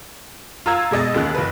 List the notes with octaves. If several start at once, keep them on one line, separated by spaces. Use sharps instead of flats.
F4 A#5 E6 G#6
B2 G#3 D#5 A6
D#2 C#3 F#6
F#1 B4